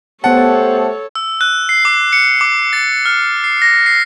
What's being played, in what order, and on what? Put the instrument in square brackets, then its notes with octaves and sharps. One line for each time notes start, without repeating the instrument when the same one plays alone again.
[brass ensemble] A3 G4 C5 [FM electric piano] B3 A5 [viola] A4 C#5 [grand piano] F#5
[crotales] E6
F#6
C7
D6
C#7
D6
A6
F6
C7
A#6
C7